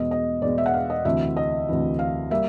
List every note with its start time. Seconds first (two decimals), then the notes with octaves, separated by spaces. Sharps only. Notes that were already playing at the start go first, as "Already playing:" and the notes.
Already playing: E2 B2 G#3 D#5
0.11 D#5
0.42 E2 B2 G#3 D5
0.58 E5
0.66 F#5
0.74 F5
0.90 D#5
1.05 D2 C3 E3 E5
1.36 D#5
1.69 D2 C3 E3
1.99 F5
2.30 G3 A#3 E5